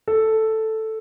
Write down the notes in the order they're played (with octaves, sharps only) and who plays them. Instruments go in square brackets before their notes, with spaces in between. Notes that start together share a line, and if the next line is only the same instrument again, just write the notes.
[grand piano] A4